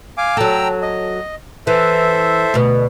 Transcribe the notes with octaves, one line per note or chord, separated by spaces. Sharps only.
F5 G#5 D6
F#3 A4 G5 A#5 E6
D#5
E3 A4 C5 E5
D2 B2